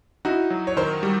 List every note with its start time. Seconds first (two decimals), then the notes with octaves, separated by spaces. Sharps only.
0.25 D#4 E4 F#4
0.50 F#3
0.67 C#5
0.77 D#3 A#4 C5
1.03 G3